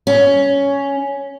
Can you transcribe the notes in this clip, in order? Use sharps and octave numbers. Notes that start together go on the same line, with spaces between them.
C#4